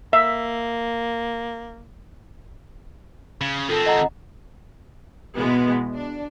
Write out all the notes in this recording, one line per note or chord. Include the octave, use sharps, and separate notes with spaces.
A#3 E5
C#3
D#3 C4 F4 A4
D#5 F#5 A#5
B2 E3 G#3 B3
D4